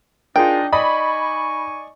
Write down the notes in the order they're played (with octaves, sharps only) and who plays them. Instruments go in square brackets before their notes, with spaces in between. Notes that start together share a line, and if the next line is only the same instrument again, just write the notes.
[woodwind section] D4 D#4 [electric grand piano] F4 G#4 A#4 [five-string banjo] G5
[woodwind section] D#4 G#5 C#6 [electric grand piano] D5 D#5 D#6 [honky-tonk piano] B5